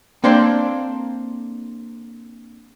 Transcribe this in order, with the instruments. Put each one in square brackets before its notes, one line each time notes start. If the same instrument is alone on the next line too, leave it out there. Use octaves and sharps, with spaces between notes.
[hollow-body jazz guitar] A#3 C4 D4 A4 C5 D5